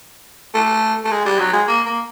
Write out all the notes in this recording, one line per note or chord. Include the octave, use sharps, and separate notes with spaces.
A3
A3
G#3
G3
F#3
G#3
A#3
A#3